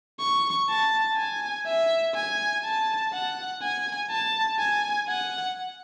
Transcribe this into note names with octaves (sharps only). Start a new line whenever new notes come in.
C#6
A5
G#5
E5
G#5
A5
F#5
G#5
A5
G#5
F#5